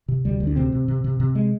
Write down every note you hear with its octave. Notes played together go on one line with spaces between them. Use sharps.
C3
D2 G3
D2
D4
C3 C4
C3
C3
C3
C3
G#3